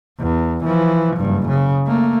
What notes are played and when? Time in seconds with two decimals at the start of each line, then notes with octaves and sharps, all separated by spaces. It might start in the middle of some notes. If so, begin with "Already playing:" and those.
0.19 E2
0.64 E3 F3
1.17 F#1 G2
1.48 C#3
1.87 A3 A#3